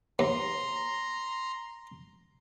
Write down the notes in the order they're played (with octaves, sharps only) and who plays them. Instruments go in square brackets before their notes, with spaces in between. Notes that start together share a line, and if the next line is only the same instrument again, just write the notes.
[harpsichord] D#2 [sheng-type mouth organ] A#5 C6